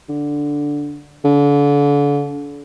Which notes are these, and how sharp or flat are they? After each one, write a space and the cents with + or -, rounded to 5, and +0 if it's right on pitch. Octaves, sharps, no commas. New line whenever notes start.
D3 -5
D3 -40